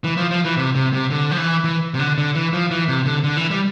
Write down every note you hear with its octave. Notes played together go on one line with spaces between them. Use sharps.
E3
F3
F3
E3
C3
C3
C3
D3
F3
E3
E3
C3
D3
D3
E3
F3
E3
C3
D3
D3
E3
G3